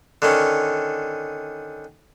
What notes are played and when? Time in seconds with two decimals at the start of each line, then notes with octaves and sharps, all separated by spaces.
0.22 D3 D#3 C#4